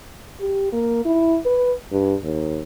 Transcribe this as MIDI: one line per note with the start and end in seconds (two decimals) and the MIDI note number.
0.40 0.72 67
0.72 1.01 58
1.05 1.38 64
1.46 1.74 71
1.92 2.15 43
2.23 2.62 39